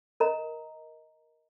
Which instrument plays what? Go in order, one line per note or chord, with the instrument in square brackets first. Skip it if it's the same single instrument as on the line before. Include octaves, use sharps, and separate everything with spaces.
[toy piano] A#4 D#5 A#5